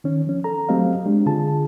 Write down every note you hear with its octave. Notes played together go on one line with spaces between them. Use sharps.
D#3 C#4
F3 C#4
A4 A#5
F#3 A3 C4 G4 D#5 F5
G#3 D4 G4
D3 F4 G#4 A5